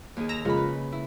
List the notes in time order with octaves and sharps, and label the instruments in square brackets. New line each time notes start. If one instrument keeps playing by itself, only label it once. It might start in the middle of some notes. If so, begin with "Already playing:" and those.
[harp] D#2 G#4
[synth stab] A#5 E6 A#6
[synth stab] F2 G#3 F4 [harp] C#3 A#4 B5
[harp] B4
E4